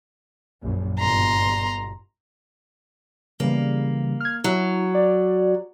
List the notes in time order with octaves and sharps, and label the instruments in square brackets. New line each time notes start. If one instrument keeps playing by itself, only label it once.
[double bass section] A#1 F#2
[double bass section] G1 B2 [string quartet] A#5 C6
[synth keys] C#3 E3 G3 [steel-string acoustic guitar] A#3
[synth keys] F6 G#6
[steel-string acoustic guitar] F#3 [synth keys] E4
[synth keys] D5